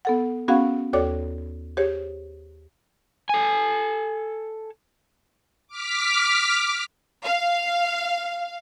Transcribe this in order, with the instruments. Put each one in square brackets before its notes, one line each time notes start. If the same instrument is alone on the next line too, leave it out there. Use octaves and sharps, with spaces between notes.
[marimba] B3 A4 F#5
B3 C#4 F#4 G#4 F5 F#5
D#2 F#4 A4 C#5 D5 D6
G4 G#4 C5 C#5
[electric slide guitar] A4 G#5
[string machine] D6 F6 B6
[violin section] F5